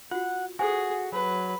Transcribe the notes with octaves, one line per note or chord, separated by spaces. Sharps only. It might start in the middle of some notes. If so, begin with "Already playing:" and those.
F4 F#4 F#5
F#4 G#4 A4 C5 G#5
F#3 B4